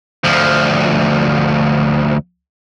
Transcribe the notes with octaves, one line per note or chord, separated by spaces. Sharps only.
D2 F3